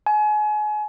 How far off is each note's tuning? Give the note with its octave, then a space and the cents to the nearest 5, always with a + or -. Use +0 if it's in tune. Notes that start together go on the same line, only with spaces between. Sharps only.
G#5 +30